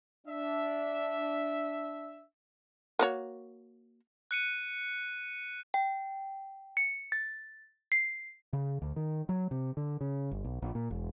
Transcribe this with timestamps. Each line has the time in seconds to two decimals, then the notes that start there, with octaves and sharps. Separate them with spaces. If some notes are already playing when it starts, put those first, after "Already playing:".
0.27 D4 E5
2.99 A#3 F#4 C#5
4.31 F#6 C#7 D#7
5.74 G5
6.77 C#7
7.12 A6
7.92 C7
8.53 C#3
8.82 D2
8.96 D#3
9.29 F#3
9.51 C3
9.77 D3
10.01 C#3
10.31 G1
10.44 B1
10.62 A#1
10.75 A#2
10.91 E1